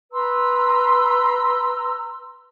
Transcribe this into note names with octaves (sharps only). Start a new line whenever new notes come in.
B4 A#5 C6 E6